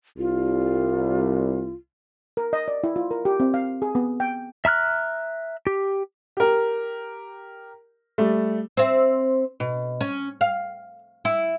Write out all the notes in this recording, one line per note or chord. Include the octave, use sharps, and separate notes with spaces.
C2 F4
A#4
D#5
D5
E4
F4
A#4
G4
C4
F5
G#4
B3
G5
E5 A#5 F6 F#6
G4
G4 A#4
G3 A3
C4 E5
B2
C#4
F5
E4